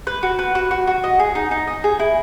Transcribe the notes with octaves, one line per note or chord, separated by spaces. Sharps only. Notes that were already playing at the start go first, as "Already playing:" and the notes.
B4
F#4
B4
F#4
F#4
F#4
D#5
G#4
D#4
D#4
D#5
G#4
E4